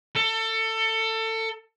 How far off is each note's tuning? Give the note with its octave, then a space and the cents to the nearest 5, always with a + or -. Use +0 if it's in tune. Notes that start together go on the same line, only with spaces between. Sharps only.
A4 +25